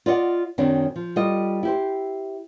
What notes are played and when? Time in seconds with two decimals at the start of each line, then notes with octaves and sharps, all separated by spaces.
0.06 F4 D5 D#5 F#5
0.58 F#2 D#3 F#3 C4 D4
0.96 F3
1.16 G3 F4 A4 D#5
1.63 E4 G4 C5